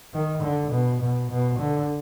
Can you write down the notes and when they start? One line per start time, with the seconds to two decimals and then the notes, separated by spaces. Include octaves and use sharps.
0.14 D#3
0.42 D3
0.71 B2
1.02 B2
1.30 B2
1.59 D3